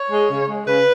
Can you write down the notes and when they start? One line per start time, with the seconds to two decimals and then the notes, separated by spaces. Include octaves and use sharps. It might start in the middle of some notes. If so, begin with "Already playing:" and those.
Already playing: C#5
0.10 G#3
0.29 C#3
0.48 G#3
0.67 C#3 B4